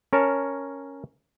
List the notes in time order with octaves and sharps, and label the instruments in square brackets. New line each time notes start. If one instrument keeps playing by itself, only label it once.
[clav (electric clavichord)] C#4 A#4 C#5 A5